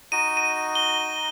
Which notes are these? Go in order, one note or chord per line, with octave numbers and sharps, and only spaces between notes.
D#4 F#4 D#5 D#7
D#7
G7